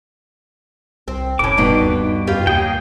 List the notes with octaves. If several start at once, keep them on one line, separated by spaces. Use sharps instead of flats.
C2 C4
F1 A2 C#4 D6
G2 B2 D#4
D#2
F#2 F4 G4 B4
D#2 C#3 A#3 G#4 G5